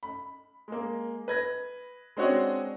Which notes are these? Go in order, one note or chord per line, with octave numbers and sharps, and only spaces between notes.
B5
G#3 A#3
B4 G#6 A#6
G#3 C4 D4 F#4 C#5 D#5